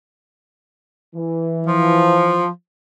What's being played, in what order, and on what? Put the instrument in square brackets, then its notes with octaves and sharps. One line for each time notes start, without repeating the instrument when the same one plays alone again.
[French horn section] E3
[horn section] F3